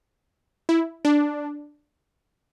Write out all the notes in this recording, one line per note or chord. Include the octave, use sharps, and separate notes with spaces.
E4
D4